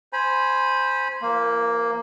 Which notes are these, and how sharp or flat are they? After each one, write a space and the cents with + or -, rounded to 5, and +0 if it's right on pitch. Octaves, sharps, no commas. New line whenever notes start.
C5 +0 G#5 +0 B5 -20
F3 -45 A#3 +0